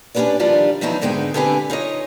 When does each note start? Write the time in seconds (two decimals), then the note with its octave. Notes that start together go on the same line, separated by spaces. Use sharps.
0.15 C#4 D4 F4 G4 B4 D5
0.40 D#3 F3 G3 D4 E4 F4
0.81 D#3 F3 F#3 B3 D#4 E4
1.02 G#2 D3 G#3 B3 D#4 G5
1.34 D3 C4 G4 B4 F#5 G#5
1.70 D#4 F4 C#5 D#5